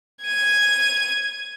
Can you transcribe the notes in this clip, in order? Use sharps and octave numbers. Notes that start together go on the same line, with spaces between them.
G#6 D#7